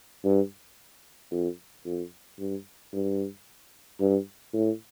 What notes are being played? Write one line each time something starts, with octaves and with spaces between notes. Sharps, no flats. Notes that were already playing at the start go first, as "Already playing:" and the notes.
G2
F2
F2
G2
G2
G2
A2